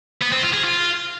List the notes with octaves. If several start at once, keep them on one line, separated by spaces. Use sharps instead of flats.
B3
C4
F4
G#4
F4